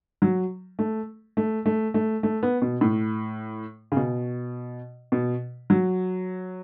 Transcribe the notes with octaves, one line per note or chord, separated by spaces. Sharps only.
F#3
A3
A3
A3
A3
A3
B3
B2
A2
C#3
B2
B2
F#3